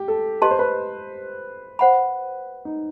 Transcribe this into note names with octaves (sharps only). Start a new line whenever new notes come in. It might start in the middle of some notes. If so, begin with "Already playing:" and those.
Already playing: G4
A4
G4 B4 D#5 A5 C6
C5
B4
C5 F#5 B5
D#4